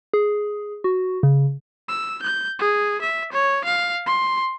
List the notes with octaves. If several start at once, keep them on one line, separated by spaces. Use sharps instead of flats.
G#4
F#4
C#3
E6
G6
G#4
E5
C#5
F5
C6